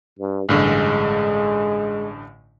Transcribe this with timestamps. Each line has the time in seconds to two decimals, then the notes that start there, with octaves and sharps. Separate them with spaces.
0.19 G2
0.49 A1 G2 D3 G#3